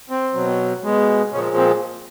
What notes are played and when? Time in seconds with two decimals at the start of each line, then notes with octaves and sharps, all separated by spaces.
0.10 C4
0.34 B2 F#3
0.83 B2 G#3
1.32 A#2 C#3 F3 G#3 C#4
1.57 C4